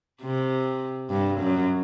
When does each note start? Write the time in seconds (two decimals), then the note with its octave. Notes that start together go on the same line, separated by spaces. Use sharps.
0.22 C3
1.10 G2
1.40 F#2